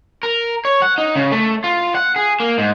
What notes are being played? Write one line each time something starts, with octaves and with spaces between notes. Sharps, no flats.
A#4
C#5
F#5
D#4
C#3
A3
F4
F#5
G#4
A#3
G#2